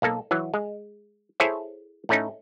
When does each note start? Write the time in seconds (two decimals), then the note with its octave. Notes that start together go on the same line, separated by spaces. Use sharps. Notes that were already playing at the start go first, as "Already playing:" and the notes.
0.02 B1 A#3 A4
0.31 E3 F#3
0.54 G#3
1.40 E4 G#4 A4 C5 C#5 E5
2.09 A2 A3 C#4 D#4